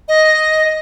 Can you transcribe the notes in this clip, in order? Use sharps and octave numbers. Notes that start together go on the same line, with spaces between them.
D#5